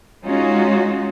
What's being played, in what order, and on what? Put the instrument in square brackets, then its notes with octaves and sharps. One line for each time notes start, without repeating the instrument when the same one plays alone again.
[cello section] G#3 C#4 D#4 F4 F#4